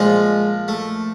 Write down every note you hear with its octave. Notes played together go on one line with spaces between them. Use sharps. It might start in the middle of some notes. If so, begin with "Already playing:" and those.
Already playing: A#2 F3 G#3
A3